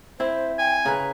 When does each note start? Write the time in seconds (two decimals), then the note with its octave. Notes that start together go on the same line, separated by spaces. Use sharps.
0.20 C4 E4 C5
0.59 G5 G#5
0.85 C#3 B4 A#5